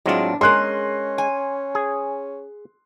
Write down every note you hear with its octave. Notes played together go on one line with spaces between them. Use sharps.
A2 F#3 G#3 C4 D4 F4
G#3 C#4 G#4 A#4 C6 F#6
G#5
G#4